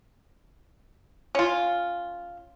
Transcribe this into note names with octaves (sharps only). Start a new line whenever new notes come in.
C#4 F4